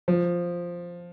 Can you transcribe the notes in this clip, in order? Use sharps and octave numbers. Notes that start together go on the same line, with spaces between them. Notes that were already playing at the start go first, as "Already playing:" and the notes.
F3